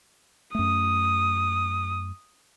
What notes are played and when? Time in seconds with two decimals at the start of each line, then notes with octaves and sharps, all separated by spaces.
0.55 F#2 A3 D#6